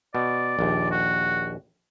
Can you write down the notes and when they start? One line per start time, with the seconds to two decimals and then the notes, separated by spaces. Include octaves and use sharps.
0.15 B2 D5
0.59 A#1 D#2
0.91 F#4